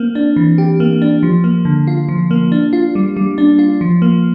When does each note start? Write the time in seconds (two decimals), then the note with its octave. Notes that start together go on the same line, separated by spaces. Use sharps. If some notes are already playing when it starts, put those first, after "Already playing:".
Already playing: A#3 C4
0.15 D4
0.36 E3
0.58 G4
0.80 A#3
1.02 D4
1.23 F3
1.44 A#3
1.65 D3
1.87 F4
2.09 F3
2.31 A#3
2.52 D4
2.73 F4
2.95 G3
3.17 G3
3.38 D4
3.59 F4
3.81 F3
4.02 A#3